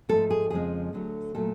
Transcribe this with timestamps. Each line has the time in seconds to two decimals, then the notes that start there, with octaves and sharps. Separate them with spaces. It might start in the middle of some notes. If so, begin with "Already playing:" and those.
0.09 G#2 F3 A3 A4
0.30 G#4
0.50 F2 C#3 F3 G#3 G#4
0.93 D2 D3 F#3 A3
1.35 A#2 F#3 A3 A4